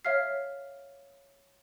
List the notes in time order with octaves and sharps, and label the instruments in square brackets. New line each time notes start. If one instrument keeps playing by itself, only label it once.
[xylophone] C#5 E5 F5 F6 C7